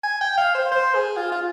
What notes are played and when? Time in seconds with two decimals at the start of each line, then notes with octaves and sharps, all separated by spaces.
0.03 G#5
0.21 G5
0.38 F5
0.55 C5
0.72 C5
0.94 G#4
1.17 F4
1.32 F4